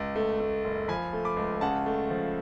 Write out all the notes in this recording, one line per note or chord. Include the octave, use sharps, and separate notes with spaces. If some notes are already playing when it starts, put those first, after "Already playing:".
Already playing: C#2
A3
A3
F#1
F3 G#5 B5
A3
B5 D6
C#2
C#3 F#5 A5
A3
F3